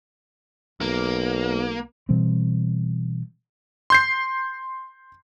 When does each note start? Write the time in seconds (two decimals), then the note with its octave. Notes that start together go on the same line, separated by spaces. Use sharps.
0.81 B1 A#3
2.09 B2 E3 G3 C4
3.90 C6 G6 C7